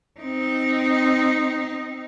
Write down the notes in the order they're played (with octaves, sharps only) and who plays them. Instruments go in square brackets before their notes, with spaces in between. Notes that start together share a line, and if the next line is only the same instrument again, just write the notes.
[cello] C4 D#4